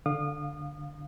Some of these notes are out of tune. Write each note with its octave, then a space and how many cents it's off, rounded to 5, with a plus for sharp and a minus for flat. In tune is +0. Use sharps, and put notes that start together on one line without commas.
D3 +0 F5 +15 D#6 -30